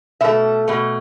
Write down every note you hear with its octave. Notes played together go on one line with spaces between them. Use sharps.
B2 A3 E5
B2 A3